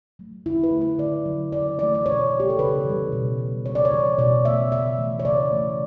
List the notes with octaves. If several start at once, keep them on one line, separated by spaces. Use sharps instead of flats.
F#3 A3
D3 E4
B4
A3
B4
D3 D5
F#3 A3
C#3 D5
E3 A3 D5
D5
B2 C#5
F#3 A3
G4
A4
C#3 B4
E3 G3
B2
G3
C#3 C#5
D5
C#5
E3 G3
B2 D5
F#3 A3 E5
C#3 E5
E3 A3
C#5
C#3 D5
E3 A3